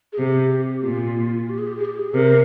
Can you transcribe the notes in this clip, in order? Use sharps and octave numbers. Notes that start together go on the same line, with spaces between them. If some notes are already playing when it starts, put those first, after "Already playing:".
G#4
C3 G4
A#2 F4
G4
G#4
G4
G#4
G4
G#4
G4
G#4
C3 A#4